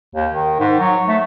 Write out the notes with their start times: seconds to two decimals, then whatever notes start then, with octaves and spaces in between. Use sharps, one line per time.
0.15 D#2
0.33 D#3
0.59 G#2
0.80 F#3
1.08 A3